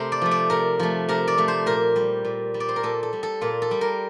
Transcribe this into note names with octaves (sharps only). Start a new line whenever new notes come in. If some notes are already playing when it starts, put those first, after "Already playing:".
Already playing: C3 A3 A#4 C5
D5
F3 A3
D5
C3 A#4
F3 A3
C3 A#4
D5
F3 A3
C5
A#2 A#4
G3
A#2
G3
D5
C5
A#4
A#2 A4
A4
G3
A4
A#2 F4
A4
G3
A#4